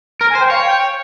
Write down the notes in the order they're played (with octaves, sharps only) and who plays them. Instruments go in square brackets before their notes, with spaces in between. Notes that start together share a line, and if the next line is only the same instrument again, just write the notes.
[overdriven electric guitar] A#4 [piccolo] F6
[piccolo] G#5
[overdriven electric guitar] C5
[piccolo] G5
[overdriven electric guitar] C#5 [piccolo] F5
[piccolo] G5